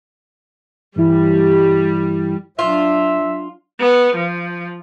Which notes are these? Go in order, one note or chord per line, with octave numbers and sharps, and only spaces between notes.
G2 E3 G3 E4
F#3 D4 F4 E5
B3
F3